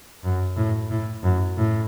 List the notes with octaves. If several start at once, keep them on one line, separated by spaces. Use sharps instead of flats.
F#2
A2
A2
F#2
A2